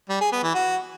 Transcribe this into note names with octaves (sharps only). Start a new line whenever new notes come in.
G3
G#4
B3
E3
F#4